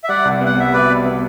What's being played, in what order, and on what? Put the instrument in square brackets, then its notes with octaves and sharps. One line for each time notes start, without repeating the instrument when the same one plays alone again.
[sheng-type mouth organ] E5
[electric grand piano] G3 [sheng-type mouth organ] D5 F#5
[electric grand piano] C2
[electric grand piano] B3 [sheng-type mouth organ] F#5
[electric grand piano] G3 [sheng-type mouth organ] E5
[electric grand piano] B2 [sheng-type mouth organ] B4 D5
[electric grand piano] B3
B3